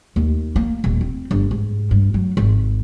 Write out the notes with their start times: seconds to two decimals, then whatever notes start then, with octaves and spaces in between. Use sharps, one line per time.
0.16 D#2
0.56 A#3
0.84 D#1
1.01 C4
1.31 G1
1.51 G#2
1.91 G2
2.14 F#3
2.37 G#1